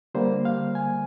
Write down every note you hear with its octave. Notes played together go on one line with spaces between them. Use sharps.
D3 G3 A#3 C5
F5
G#5